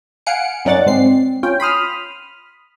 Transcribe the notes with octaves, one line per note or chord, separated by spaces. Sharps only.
F5 F#5 G#5 C#7 D7
F#2 C#4 D#4 D5 F#5 A6
G#2 C4 C7
C#4 F4 G5
B5 C6 D#6 F6